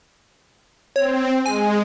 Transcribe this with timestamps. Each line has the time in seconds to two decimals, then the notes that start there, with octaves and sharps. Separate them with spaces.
0.96 C4 C#5
1.46 G#3 G#5